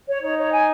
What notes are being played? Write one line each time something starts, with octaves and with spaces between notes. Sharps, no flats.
C#5
D#4 C#5
C#5
G#5